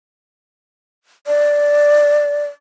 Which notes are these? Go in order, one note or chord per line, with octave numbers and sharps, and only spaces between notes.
D5